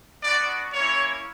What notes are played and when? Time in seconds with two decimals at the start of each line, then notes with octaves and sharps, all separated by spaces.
0.22 B3 D4 F#4 D5
0.73 A#3 C#4 E4 C#5